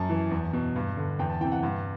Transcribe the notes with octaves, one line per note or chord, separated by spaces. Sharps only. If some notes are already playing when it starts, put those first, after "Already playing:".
Already playing: F#2 A5
E3
E2
B2
G2
D3
E2 G5
A5
C3 E3 G5
F#5
G2